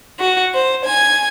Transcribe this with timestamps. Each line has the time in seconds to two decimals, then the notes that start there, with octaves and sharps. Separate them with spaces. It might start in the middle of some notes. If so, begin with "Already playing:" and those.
0.18 F#4
0.54 C5
0.85 G#5